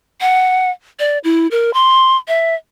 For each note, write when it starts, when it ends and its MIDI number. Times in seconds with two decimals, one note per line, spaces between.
0.21 0.70 78
0.99 1.18 74
1.24 1.47 64
1.51 1.73 70
1.74 2.17 84
2.28 2.55 76